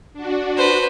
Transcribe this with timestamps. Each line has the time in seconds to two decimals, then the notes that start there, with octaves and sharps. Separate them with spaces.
0.13 D4 F#4
0.57 B4 C5